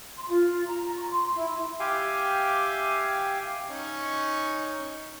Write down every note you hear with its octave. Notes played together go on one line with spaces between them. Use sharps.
C6
F4
A#5
C#6
C6
E4
G4 E5 F5 G5 G#5
C#4 D#4 C#6